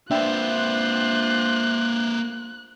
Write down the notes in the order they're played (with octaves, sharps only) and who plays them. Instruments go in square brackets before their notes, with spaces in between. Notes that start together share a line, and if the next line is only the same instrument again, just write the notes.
[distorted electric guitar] A#3 B4 [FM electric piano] D4 E5 G5 [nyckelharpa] F4 C5 [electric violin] F#6